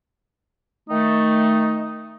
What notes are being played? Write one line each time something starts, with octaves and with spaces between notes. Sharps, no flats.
D#3 A3 D#4